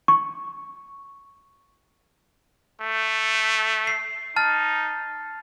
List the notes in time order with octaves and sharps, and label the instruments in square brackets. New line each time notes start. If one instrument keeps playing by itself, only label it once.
[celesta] C#6
[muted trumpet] A3
[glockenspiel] C7
[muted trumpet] D#4 [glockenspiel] A5 F6 A6